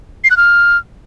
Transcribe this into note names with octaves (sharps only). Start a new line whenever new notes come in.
C7
F#6
F6